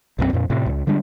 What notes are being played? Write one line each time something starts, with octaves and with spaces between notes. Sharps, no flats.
B1 F#2 F#3 C4
F2 A#2
A2 C3
C#2
D3 G3 G#3 D4